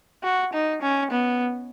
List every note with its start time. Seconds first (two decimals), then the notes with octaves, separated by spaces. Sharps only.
0.24 F#4
0.53 D#4
0.82 C#4
1.11 B3